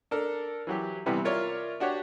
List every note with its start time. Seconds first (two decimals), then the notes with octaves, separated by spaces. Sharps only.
0.11 D4 A4 A#4
0.67 E3 F#3 G4
1.06 C3 E3 G3 B3
1.25 F4 A#4 C#5 D5 E5
1.80 D4 F#4 G4 C#5